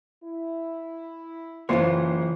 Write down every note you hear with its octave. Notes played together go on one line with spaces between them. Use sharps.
E4
F#1 E3 F4 C5 C#5 C7